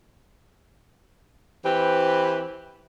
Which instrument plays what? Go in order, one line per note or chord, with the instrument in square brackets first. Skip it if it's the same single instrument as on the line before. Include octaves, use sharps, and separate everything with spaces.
[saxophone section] E3 C4 G4 B4